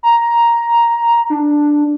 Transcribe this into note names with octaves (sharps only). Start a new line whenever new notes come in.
A#5
D4